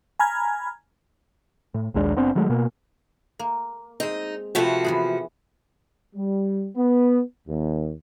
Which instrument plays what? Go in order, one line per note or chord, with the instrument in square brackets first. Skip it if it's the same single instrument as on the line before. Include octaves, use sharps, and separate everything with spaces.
[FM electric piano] G#5 A#5 B5 F6 G#6
[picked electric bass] A2
A#1 D#2 G#3 D4
F#1 B3 C4 D4
D#3 F#3 G#3 A3
B2 A#3
[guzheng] A#3
[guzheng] G#3 C4 [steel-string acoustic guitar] D#4
[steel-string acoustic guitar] C3 F3 F#4 [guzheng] A3 A4 B4
[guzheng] E3 B3 G#4
[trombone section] G3
B3
D#2